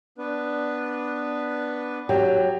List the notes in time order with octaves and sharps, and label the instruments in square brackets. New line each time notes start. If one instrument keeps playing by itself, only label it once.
[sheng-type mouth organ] B3 D4 B4
[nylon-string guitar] F#3 [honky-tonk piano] G4